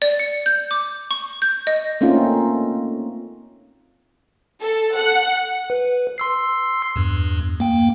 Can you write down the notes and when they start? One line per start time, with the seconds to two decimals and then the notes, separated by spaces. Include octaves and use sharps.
0.02 D5
0.20 C#7
0.46 G6
0.71 D6
1.11 C#6
1.42 G6
1.67 D#5
2.01 A3 A#3 C4 C#4 D#4 F4
4.62 A4
4.96 F#5
5.70 B4
6.18 C6 E6 C7
6.96 E2 G2
7.60 A#3 G5